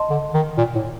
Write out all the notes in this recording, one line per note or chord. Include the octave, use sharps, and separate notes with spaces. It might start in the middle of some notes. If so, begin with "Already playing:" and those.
Already playing: D#5 A5 C6
D3
D#3
A#2
A2